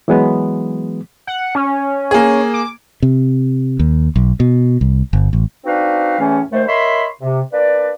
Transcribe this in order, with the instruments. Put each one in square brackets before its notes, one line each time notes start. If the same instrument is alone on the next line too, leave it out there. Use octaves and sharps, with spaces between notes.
[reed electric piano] E3 F#3 G#3 B3
[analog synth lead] F#5
C#4
[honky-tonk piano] A#3 G#4
[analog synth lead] D6
[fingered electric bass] C3
D#2
B1
B2
C2
G1
A1
[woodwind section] C4 D4 D#4 F#4 B4 F5
E2 A2 E3 A3 C#4
D#2 A3 C5
A#4 C#5 D#5 E5 B5 C6
C3
A#3 D4 B4 D5